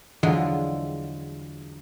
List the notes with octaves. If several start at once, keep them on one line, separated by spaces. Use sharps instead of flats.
E2 D3 F3 F#3 G#3